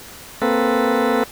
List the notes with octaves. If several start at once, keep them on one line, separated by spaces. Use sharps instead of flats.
A#3 C4 A4 B4